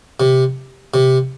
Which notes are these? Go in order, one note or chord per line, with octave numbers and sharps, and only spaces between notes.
C3
C3